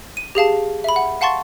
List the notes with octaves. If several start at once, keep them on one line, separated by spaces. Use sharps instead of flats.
D#7
G4 G#4 F5 A5
E5 B5
F#5
F5 F#5 A5 C6 C#6 A6